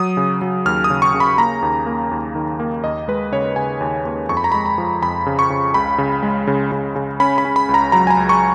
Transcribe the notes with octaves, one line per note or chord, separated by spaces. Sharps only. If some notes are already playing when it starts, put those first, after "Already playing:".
Already playing: F#3 D#6
C#3
F#3
D#2 F6
D#6
C#3
C#6
C#3
B5
A#3 A#5
D#2
A#3
D#2
D#3
A#3
D#2 D#5
G#3 B4
C#3 C#5
C#3 G#5
D#2
D#2
F2 C#6
B5
A#5
G#3 B5
A#5
F3
F2 B5
C#3
C#6
C#3
C#2 B5
C#3
G#3
C#3
C#3
C#3
C#4 B5
B5
C#4
B5
C#2
A#5
F#3 A#5
G#5
A#5
C#2
C#6